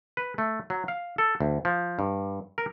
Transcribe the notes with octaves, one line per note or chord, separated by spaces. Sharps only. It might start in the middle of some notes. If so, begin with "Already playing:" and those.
B4
A3
F#3
F5
A4
D2
F3
G2
A#4